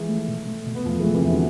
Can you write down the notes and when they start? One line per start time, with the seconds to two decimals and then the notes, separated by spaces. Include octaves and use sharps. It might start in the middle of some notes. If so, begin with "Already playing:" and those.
Already playing: E3 F3 G#3
0.09 A3
0.28 B2
0.47 A3
0.66 B2
0.75 B3
0.85 E2 F3 A3
1.00 E3 G#3
1.04 A3
1.14 C3 E3
1.24 E2
1.29 B2 D3